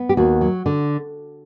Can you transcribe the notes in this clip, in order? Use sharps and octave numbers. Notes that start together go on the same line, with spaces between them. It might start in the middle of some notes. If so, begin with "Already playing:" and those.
Already playing: B3
G4
D#2 F#4
F#3
D3